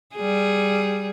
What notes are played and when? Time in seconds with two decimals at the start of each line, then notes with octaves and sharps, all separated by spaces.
0.16 G3 G#4